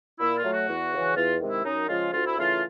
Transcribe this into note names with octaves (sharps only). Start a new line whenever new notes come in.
A#2 E4
F4
F#3 A3
F#4
E2
C#3 E3
E2 F4
C3 D#3 G#3
E4
F#2 D#4
C#3 F3 G#3 F4
D2 F4
E4
C#3 E3 A3 F4